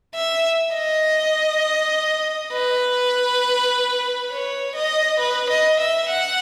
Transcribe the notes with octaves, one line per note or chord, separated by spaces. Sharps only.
E5
D#5
B4
C#5
D#5
B4
D#5
E5
F#5